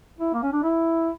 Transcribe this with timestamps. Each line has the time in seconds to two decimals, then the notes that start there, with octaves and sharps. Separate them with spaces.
0.18 E4
0.34 A#3
0.43 C#4
0.53 D4
0.63 E4